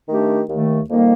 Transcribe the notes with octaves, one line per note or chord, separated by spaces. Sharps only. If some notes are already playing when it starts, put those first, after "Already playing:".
D#3 A3 D4 G4
D#2 D#3 A3
F2 D#3 G3 A#3